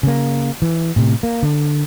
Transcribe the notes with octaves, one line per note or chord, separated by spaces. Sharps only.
C#3 A#3
E3
A2 C3
A#3
D3